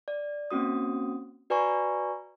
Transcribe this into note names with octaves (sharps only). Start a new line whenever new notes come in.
D5
A#3 C4 C#4 F#4 D#6
F#4 B4 D5 G#5 A#5 C#6